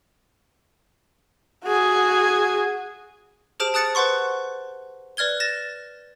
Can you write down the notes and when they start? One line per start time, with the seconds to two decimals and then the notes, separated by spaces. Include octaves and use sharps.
1.65 F#4 G#4
3.60 G4 G#4 C5 A5 F6 D7
3.74 A5 D#6 F#6 A6 C#7
3.95 B4 C5 F#5 C6 C#6
5.17 B4 D5 F6 G#6 G7
5.40 A6 A#6 E7